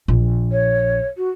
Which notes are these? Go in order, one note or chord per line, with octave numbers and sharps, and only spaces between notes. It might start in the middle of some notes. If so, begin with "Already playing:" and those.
A#1
C#5
F#4